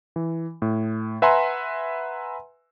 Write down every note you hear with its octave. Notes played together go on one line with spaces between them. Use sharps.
E3
A2
B4 E5 F#5 G#5 A#5 C6